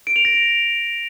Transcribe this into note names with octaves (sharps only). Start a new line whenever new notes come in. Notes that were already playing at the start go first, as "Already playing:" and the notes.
D7
F7
A#6